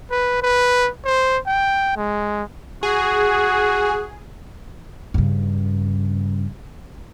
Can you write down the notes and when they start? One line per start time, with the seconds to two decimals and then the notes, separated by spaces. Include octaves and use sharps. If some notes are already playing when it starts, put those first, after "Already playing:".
0.11 B4
0.42 B4
1.05 C5
1.47 G5
1.97 G#3
2.83 F#4 G#4
5.14 G2 C#3